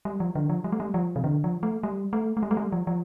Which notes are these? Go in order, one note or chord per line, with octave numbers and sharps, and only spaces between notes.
G3
F3
D3
F3
G3
A3
G3
F3
C3
D3
F3
A3
G3
A3
A3
G3
A3
G3
F3
F3